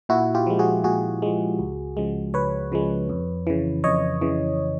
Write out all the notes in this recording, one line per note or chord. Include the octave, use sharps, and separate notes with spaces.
A#2 E4 F#4
F4 G4
F3 G#3
F#4 G#4
A#2 F#4 G#4
F3 G#3
C#2
C#3 F3 G#3
C#2 B4 C#5
C#3 F3 G#3
F2
C#3 E3
F2 C#5 D#5
C#3 E3